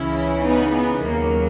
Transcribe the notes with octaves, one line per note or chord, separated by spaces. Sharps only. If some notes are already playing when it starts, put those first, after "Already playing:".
Already playing: C#2 C#3 E3 C#4 E4
B3 D#4
B3
D#2 C#3 F#3 A#3